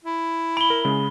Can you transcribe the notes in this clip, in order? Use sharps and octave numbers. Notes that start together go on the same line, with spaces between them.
E4
B5 D7 G7
A#4
C#3 G#3